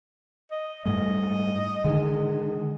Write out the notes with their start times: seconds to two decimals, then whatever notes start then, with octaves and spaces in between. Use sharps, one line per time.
0.51 D#5
0.86 G#2 G3 A3 D#5
1.84 D3 D#3 G#3